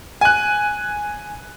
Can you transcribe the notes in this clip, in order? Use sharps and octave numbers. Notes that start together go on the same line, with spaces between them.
G#5 F#6